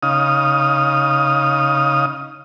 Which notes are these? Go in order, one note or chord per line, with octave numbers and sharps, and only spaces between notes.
C#3 D#4 F5 D#6